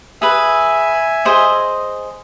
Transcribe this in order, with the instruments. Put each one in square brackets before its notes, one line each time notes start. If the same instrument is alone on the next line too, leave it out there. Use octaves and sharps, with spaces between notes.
[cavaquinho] G#4 B4 [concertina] E5 G#5
[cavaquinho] G#4 C5 D#5